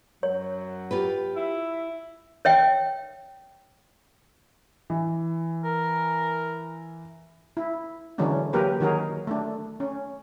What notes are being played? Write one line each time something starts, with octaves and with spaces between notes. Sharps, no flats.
F#2 F#3 C#5
F4 G4 B4
E4 E5
C#5 E5 G5
E3
A#4
E4
D3 E3 F#3 G#3 C#4 D4
F#3 A#3 G4 A#4 B4
D#3 F#3 D#4 F#4 G#4 A#4
A3 D4
C#4